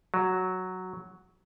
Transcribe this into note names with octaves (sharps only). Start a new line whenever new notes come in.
F#3